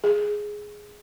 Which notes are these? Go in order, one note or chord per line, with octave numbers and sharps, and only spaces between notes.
G#4